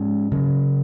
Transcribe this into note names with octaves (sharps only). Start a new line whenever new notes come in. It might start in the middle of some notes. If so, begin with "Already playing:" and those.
Already playing: G#2 G#3 C#4
C#3 F#3 C#4